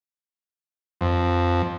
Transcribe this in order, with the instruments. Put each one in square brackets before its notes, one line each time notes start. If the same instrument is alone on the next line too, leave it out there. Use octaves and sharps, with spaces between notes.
[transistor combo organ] F2